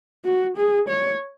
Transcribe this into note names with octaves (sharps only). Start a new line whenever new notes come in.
F#4
G#4
C#5